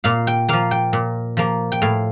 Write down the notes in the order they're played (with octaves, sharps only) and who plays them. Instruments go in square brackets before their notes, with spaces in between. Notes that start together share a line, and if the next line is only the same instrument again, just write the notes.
[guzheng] A#2 F5
G5
F3 A#3 F5
G5
A#2
F3 A#3
G5
A2 F5